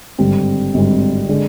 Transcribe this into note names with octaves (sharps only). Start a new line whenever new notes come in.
G#1 G2 D3 G3 C4
G#1 G2 D3 G3 C4
D3 G#3 D4